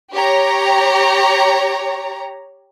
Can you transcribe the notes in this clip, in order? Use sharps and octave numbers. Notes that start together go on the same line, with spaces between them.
G4 C#5 A#5